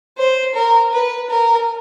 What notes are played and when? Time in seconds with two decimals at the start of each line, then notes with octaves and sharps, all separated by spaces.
0.17 C5
0.55 A#4
0.93 B4
1.30 A#4